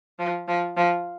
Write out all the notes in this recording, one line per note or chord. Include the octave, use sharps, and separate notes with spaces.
F3
F3
F3